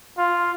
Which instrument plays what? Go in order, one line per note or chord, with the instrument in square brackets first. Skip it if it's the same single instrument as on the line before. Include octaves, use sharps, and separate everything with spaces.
[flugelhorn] F4